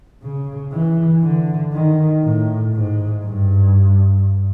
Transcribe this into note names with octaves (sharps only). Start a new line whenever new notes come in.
C#3
E3
D3
D#3
A2
G#2
G2